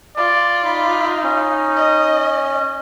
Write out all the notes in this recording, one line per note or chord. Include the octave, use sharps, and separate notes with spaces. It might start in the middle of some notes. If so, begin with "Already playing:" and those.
F4 D5
D#4 B5
C#4
D#5